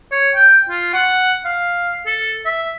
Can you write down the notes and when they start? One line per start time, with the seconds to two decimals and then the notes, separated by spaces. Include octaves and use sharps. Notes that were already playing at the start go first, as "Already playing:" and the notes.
0.12 C#5
0.35 G5
0.70 F4
0.93 F#5
1.45 F5
2.06 A4
2.45 E5